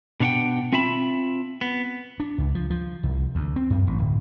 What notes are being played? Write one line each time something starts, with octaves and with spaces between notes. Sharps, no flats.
B2 D4 C#5 F#5 G5
C4 F4 E5 A5 B5
B3
D4
C#2
F3
F3
C2
D2
C4
F#2
A1
D1